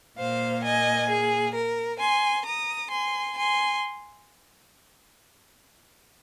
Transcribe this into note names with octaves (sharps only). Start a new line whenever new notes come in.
A#2 A#3 C5 F5
D#5 G#5
G#4
A#4
G#5 C6
A#5 D#6
G#5 C6
G#5 C6